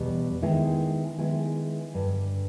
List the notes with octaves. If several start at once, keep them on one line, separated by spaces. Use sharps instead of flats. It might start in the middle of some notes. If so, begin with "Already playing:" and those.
Already playing: E2 B2 G3
D#3 G#3 B3 E4 G#4
D#3 G#3 B3 E4 G#4
G2 D3 G3